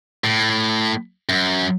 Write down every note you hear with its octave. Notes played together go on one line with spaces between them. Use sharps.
A2
F#2